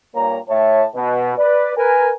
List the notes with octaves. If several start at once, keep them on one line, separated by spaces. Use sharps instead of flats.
G2 A#2 A#3 C#5 A#5
A2 C#5 E5 A5
B2
B4 D5
A#4 B4 G#5